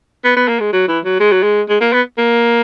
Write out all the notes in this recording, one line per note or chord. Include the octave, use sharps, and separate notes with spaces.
B3
B3
A#3
G#3
F#3
E3
F#3
G#3
F#3
G#3
G#3
A#3
B3
A#3